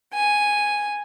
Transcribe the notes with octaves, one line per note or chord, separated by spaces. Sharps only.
G#5